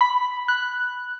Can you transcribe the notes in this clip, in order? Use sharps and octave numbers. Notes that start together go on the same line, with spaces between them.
B5
F#6